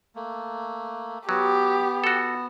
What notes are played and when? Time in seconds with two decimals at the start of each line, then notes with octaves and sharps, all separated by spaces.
0.15 A3 A#3
1.29 F#3 B3 G4
2.04 F#4 A4